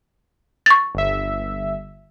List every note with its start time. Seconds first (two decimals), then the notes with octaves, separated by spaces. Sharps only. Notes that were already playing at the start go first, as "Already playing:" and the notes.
0.66 C#6 A6
0.95 G1 E5